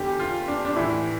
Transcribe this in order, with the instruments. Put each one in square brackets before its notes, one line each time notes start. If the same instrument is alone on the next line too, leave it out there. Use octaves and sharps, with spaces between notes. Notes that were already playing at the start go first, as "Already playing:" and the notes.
Already playing: [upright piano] E2 D3 G4
F4
D4
D4
A2 E3 E4